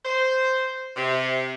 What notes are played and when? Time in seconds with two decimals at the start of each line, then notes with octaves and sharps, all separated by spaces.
0.05 C5
0.97 C3